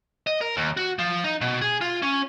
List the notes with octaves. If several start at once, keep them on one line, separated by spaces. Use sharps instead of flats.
D#5
A#4
D#2
F#4
F3
D#4
B2
G#4
F4
C#4